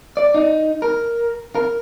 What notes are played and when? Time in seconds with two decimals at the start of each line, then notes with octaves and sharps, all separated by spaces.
0.17 D5
0.34 D#4
0.82 A#4
1.55 A#4